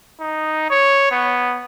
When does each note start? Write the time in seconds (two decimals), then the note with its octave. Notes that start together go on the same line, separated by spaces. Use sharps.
0.20 D#4
0.70 C#5
1.11 B3